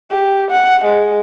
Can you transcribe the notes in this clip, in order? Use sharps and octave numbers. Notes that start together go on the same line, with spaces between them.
G4
F#5
G#3